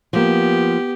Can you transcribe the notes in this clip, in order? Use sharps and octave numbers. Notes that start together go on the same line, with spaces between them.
F3 A#3 B3 G4